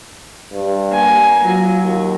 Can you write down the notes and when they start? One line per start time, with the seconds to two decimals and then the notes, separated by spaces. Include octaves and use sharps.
0.53 G2
0.92 A#3 G#5
1.44 F#3 F4
1.82 D#2